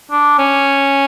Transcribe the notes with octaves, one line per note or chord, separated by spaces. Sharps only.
D4
C#4